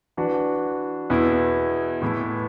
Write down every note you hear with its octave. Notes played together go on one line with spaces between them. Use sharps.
E3 D4 F#4 B4
E2 B2 B3 E4
A2 E3 B3 E4 A4